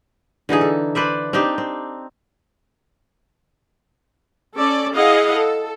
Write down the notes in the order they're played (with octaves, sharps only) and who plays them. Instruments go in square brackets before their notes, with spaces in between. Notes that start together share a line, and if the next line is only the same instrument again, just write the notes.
[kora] D3 E3 D#4 G#4
A4
B4 C5 D5 E5
C4 D4 D#4 G4
C4
[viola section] C#4 A4 D5
E4 G#4 D#5 F5 F#5
A4